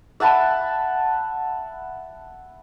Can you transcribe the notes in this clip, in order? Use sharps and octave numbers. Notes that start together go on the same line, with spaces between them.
E5 F#5 A5 B5